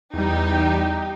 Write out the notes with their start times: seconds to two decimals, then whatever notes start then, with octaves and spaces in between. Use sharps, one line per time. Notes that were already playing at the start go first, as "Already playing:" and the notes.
0.14 E2 G3 D#4 G4